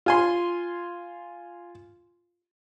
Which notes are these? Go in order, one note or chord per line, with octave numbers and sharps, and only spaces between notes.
F4 G#5 C6